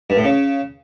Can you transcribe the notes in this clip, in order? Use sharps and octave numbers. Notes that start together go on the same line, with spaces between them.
G2
A2
C#3